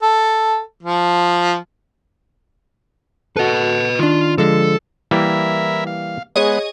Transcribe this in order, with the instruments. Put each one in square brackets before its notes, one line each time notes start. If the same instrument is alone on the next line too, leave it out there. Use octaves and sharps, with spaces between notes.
[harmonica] A4
F3
[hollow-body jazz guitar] F#4 A4 [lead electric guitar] B4 D#5
[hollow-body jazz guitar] D#3 D4 [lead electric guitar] F4
[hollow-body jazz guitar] D3 F3 G#3 [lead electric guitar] A4
[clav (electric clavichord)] E3 G3 A#3 [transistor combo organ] E4 A#4 E5
[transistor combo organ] F5
[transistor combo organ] G#3 B3 [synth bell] G#4 C#5 D#5